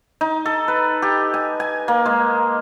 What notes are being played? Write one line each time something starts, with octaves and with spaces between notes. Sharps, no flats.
D#4
A4
B4
G4
G#5
G#5
A#3
G#3